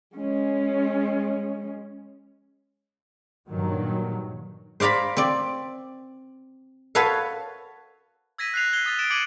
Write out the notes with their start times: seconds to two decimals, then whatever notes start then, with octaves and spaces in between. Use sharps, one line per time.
0.16 G#3 C#4
3.47 G2 A#2 D#3 F#3
4.80 C5 D5 F5 A#5 B5
5.17 C4 D5
6.95 F#4 A4 B4 C#5 E5 F5
8.38 E6 G#6 A#6 B6 D#7
8.54 F#6 C7 F7
8.73 G#6 C7 G7
8.86 D#6 F#6 A6
8.99 A6 D7 E7
9.10 D6 G#6 C#7 D#7 F#7